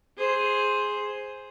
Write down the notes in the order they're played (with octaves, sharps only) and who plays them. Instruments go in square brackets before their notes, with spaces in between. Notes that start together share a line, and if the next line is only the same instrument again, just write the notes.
[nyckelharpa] G#4 C5